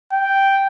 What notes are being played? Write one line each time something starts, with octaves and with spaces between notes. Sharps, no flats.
G5